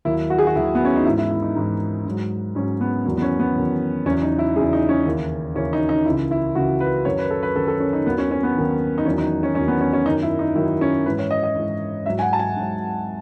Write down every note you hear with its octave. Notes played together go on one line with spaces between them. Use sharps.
D#2 D#3 F#3 E4
F#4
G#4
F#4
D#2 D#3 F#3 E4
B3
C#4
D#4
G#2 E3 E4
E4
E4
D#4
G#2 E3
G#2 F#3
G#2 F#3 C#4
B3
E2 D#3 F#3 B3
B3
C#4
B3
E2 D#3 F#3
E2 C#3 F#3 C#4
D#4
E4
E2 C#3 F#3 G#4
D#4
C#4
D#2 C#3 E3
D#2 C#3 E3 C#4
D#4
D#4
C#2 C#3 E3 E4
E4
C#2 C#3 E3 F#4
B4
F#2 D#3 F#3 C#5
B4
A4
B4
F#2 D#3 F#3 A4
A4
C#4
D#4
D#2 D#3 F#3 B3
C#4
C#4
B3
D#2 D#3 F#3
D#4
E2 D#3 F#3 C#4
D#4
C#4
E2 D#3 F#3 C#4
B3
C#4
C#4
F#2 D#3 F#3 D#4
E4
D#4
F#2 D#3 F#3 E4
C#4
G#2 E3 B4
C#5
D#5
D#5
G#2 E3
G#2 F#3 E5
G#5
F#5
A5
G#5
G#2 F#3